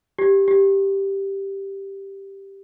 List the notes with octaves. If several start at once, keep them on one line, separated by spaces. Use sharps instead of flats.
G4
G4